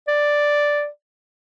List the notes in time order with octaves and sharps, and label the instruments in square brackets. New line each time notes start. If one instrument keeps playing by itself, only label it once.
[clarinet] D5